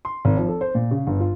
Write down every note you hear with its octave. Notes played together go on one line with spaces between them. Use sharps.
C6
G#1
F3
A4
C5
A#2
C#3
G1
F4